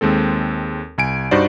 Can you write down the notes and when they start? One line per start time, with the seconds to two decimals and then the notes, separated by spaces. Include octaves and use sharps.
0.01 D#2 G#3 C4 A4
0.98 C2 G#5 D7
1.31 G2 D#4 F#4 C5 D5